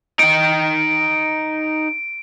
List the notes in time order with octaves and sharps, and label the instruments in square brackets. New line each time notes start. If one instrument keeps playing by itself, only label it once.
[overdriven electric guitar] D#4 G5 [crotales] D7